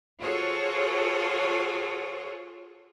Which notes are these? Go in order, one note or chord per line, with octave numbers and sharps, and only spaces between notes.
F4 F#4 G#4 A4 C5 C#5